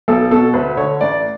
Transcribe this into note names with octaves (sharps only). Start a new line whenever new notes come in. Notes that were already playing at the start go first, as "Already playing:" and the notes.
B1 A4
B2 A4
D2 B4
D3 C#5
A1 D5